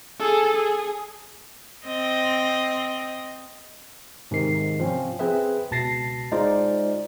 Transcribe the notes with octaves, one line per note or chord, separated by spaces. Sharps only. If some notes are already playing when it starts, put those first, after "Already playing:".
G#4 A4
G#4
C4 D#5
G#2 C3 D#3 C7
F3 C4 C#4
C4 G#4 B4 E5
C#2 B2 A5 A6 A#6 C7
G#3 D#4 F4 C5 D5